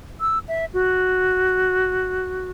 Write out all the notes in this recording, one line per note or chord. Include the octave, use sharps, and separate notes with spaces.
E6
E5
F#4